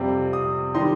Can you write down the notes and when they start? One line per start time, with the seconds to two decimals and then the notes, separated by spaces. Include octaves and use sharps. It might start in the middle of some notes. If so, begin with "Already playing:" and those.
Already playing: F2 C3 G3 C4
0.33 D#6
0.74 D#3 G3 D#4 C6